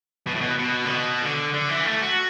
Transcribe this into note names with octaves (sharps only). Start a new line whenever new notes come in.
B2
A2
B2
B2
D3
B2
D3
D3
E3
A3
F#4